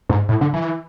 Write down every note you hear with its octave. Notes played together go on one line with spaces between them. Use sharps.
G#2
A2
D3
E3